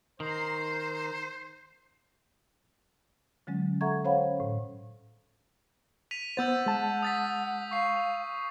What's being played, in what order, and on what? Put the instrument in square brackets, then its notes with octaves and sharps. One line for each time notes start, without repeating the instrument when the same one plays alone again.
[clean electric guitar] D#3 [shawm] C5 [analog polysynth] A#5 C7
[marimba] D3 F#3 G#3 C#4
A4 E5 F#5 A#5 C#6 G#6
C#4 C5 C#5 F5 F#5 B5
A2
[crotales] B6 D#7 F7
[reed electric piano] B3 C5 [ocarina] F#5 [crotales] E6 G6 A6
[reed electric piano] G#3 A5
[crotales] D#6 A6 B6
[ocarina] F5 [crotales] C#6 C7